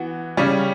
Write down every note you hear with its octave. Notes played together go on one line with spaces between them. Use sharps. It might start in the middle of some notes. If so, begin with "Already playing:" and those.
Already playing: E3 B3 F#4
C#3 G3 C#4